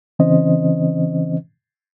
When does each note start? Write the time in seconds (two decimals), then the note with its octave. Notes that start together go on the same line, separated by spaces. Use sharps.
0.19 C#3 E3 C4 C#4 C5 D#5